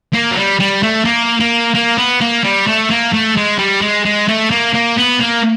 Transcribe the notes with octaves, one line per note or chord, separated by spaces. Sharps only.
A#3
F#3
G3
G3
A3
A#3
A#3
A#3
B3
A#3
G3
A3
A#3
A3
G#3
G3
G#3
G#3
A3
A#3
A#3
B3
A#3